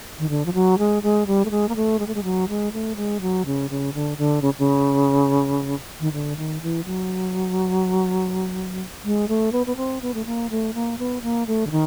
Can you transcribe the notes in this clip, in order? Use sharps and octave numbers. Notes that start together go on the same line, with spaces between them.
D#3
D3
F3
F#3
G#3
G#3
G3
A3
G#3
A#3
A3
G#3
A3
G#3
F#3
G#3
A3
G#3
F#3
C#3
C#3
D3
D3
C#3
C#3
D#3
D3
D#3
E3
F#3
G#3
A3
B3
B3
C4
B3
A3
A#3
A3
A#3
B3
A#3
A3
D3
D#3